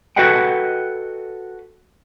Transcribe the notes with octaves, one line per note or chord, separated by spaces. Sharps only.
F#4 A4 B4 D#5 F#5 G5